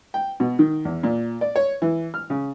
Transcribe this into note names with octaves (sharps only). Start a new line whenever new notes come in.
G5
B2
D#3
E2
A#2
D5
C#5
E3
F6
C#3